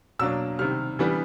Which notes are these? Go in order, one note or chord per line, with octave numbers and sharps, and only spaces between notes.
B2 F#3 A#3 D4 E6
C3 D#3 G3 F6
E3 G3 B3 D4